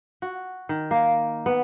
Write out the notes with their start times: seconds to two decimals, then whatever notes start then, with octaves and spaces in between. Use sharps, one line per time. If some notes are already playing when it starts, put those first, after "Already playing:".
0.22 F#4
0.69 D#3
0.91 A#3
1.46 B3